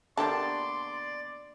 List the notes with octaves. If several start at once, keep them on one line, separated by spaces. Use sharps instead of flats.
B2 D3 A#3 G4 D5 A5 C6